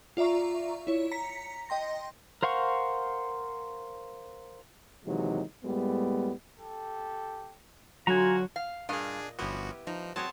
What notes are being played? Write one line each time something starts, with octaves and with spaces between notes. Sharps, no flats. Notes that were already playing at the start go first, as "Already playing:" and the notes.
F4 D5 E5 A#5 C#6
E4 C#5
A#5 B6 C#7
D#5 G5 C6 A#6
A#4 C5 F5 F#5 C#6
D#2 C3 E3 F#3 G#3 D#4
A2 G3 G#3 A#3 B3
G4 A4
D3 F#3 F4 F#4 G#5 A#5
F5
G2 A#2 D4 G#4 D#5 F5
G1 F3 B3 C#4 E4 F#4 G4
F3 D#4
F#3 C4 G#4 C#5 A5